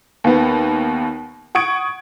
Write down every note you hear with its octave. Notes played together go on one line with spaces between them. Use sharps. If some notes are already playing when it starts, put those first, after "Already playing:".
D#2 B3
F#5 C#6 D#6 G#6 D7